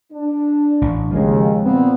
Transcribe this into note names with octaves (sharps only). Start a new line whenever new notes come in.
D4
A1
D#2 C#3 F3 G#3
A#2 B3 C4